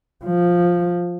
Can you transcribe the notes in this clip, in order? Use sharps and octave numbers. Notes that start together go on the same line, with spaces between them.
F3